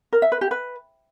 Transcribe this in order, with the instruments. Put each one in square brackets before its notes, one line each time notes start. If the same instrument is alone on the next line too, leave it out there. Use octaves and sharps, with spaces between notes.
[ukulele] A#4
E5
B4
G4
B4